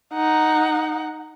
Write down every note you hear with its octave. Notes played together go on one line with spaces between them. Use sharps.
D#4 F#5